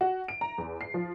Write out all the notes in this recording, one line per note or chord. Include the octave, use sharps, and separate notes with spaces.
F#4
D7
A#5
E2
C7
F3